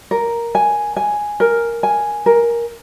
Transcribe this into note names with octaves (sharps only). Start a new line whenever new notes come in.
A#4
G#5
G#5
A#4
G#5
A#4